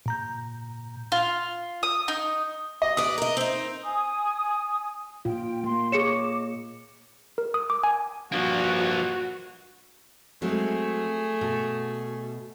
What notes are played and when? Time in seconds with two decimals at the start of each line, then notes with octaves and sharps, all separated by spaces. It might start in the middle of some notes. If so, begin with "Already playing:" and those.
0.06 A#2 A#5 G6
1.12 F4
1.83 D#6
2.08 D#4
2.82 D#5
2.97 B4 D5 D#6
3.18 A#4 D#5
3.37 C4 D#4
3.83 G#5 D#6
5.25 A#2 F4 G5
5.64 A#3 C6
5.92 G#4 C#5 D#5 D6 C#7 E7
7.38 A#4
7.54 D#6
7.70 D6
7.84 G#5
8.32 G2 F3 A#3 F#4
10.42 F#3 G#3 A3 C4 G#4
11.41 B2